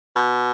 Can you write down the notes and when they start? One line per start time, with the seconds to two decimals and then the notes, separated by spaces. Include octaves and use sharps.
0.16 B2